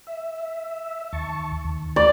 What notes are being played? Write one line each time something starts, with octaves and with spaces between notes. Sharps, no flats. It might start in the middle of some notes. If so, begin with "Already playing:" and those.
E5
D#2 A5 C#6
D#2
D5